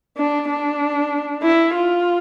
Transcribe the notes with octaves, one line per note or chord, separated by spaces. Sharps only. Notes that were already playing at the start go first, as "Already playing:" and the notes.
D4
D4
E4
F4